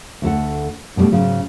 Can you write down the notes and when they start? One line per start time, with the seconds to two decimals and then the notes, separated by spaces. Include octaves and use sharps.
0.22 D2 A4 F#5
0.96 G2 B2 D3 G3 A3
1.12 G#2 C#3 F#3